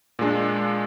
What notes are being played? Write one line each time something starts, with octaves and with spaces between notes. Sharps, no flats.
A#2 G#3 D4